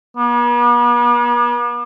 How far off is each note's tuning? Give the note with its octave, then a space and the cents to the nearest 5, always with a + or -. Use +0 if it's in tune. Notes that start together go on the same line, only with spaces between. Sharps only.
B3 -45